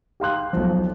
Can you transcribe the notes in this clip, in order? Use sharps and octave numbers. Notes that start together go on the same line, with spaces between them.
G4 F5 C6 F#6
B1 F3